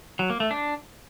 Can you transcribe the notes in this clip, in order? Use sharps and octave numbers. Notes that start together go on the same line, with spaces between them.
F#3
A#3
A3
D4